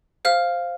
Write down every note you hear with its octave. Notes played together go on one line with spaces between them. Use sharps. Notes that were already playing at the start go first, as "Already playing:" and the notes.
C5 F5 F6